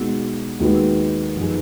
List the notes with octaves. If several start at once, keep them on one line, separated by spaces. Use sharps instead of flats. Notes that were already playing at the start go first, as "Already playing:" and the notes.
Already playing: B2 G#3 D#4 F#4
D#2 D#3 G#3 B3 F#4
F#2 F3 B3 D#4 G#4